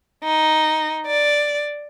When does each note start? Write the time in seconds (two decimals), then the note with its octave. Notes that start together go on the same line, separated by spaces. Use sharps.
0.23 D#4
1.06 D5